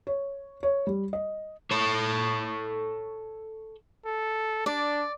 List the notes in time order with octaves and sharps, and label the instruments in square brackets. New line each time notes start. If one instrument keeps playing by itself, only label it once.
[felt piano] C#5
C#5
G3
D#5
[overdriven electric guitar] A4 C#5
[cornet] A4
[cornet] D4 [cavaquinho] D5